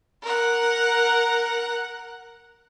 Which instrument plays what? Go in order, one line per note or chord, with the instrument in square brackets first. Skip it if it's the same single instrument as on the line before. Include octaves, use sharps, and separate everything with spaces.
[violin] A#4 F#5